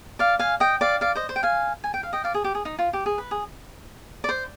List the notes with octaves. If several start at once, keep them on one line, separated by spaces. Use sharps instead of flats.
D5 F5
F5 G#5
D#5 G5
D5 F5
D5 F5
C5 D#5
C5
G5
F5 G#5
G#5
G5
F5
D#5 G5
D5 F5
G#4
G4
G#4
D#4
F4
G4
G#4
B4
G#4
D5
C5